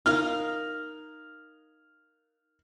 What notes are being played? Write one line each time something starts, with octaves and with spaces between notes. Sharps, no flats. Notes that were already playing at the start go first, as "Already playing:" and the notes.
D#4 A#4 F5 F6